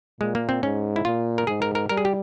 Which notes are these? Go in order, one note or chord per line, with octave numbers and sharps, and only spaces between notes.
A#2 G#3
A#3
C4
G#2 C#4
E4
A#2 F4
A#4
G#2 G#4
A#4
A#4
G3 A#4
G#4
G4